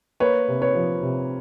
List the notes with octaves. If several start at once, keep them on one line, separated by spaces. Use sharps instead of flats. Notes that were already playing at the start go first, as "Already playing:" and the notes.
A#3 B4 C#5
C3
B4 C#5
F3
C3